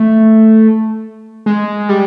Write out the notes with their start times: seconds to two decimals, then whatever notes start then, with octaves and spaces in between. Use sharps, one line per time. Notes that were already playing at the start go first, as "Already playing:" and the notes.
Already playing: A3
1.46 G#3
1.89 G3